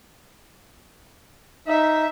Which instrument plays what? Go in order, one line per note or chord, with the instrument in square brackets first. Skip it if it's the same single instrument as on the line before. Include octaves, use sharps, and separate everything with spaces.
[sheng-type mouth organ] D#4 [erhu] E5